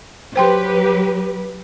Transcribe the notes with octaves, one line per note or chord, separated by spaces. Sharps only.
F#3 G4 B4 C5 G5 C6